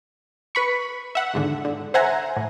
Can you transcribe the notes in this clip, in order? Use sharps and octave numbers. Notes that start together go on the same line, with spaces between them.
B4 B5 C#6
E5 F#5
E2 G#2 D3
D3
C5 E5 F#5 G#5 A#5
A2